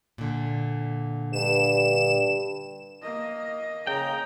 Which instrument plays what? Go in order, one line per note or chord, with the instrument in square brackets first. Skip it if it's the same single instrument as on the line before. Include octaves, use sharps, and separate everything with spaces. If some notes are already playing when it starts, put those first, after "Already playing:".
[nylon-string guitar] A#2 D3
[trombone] G2 [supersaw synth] E7
[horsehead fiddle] A#3 D#5
[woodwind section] C#3 D#6 [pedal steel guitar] G5 [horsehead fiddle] A#5